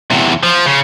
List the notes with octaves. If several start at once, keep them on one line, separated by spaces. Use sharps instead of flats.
E2 C3
F3
C#3